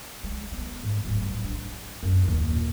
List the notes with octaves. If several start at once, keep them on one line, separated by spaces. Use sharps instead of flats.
G#3
B3
G#2
D1
G2
D4
F#2
D#2
A#2